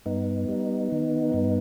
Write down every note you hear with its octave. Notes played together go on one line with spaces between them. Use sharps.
G2 B3 D#4
G3
D#3
G2